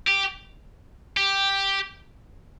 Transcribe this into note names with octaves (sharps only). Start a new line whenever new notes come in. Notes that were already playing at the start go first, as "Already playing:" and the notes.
G4
G4